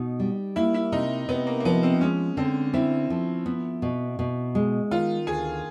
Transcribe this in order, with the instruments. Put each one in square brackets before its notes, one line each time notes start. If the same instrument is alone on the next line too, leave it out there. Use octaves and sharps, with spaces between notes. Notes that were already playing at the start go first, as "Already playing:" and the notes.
Already playing: [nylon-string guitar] B2 D#4
G3
[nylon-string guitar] A#3 [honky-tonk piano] E4
[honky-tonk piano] E4
[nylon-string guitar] C3 [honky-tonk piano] D#4
[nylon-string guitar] C3 [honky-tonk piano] B3
[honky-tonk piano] A#3
A#3
[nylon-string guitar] F3 [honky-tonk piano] B3
[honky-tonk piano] C4
[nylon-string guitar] G#3 [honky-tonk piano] C#4
[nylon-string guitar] D3 [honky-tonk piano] C4
[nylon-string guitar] C4 [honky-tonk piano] E4
[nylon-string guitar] F3
B3
B2
B2
G#3
[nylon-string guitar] D#3 [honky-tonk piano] F4
[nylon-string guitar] D2 [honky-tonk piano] G#4